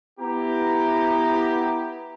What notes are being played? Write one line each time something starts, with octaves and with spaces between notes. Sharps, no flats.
B3 E4 G4 A#5